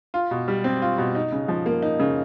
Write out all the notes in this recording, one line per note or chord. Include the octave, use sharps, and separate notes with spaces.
F4
B2
G3
C4
F4
B2
D#4
C#3
F3
A#3
D#4
C#3